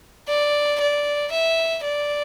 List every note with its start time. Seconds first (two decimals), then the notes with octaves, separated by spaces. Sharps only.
0.29 D5
0.80 D5
1.32 E5
1.84 D5